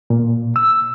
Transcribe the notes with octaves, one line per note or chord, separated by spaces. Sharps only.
A#2
E6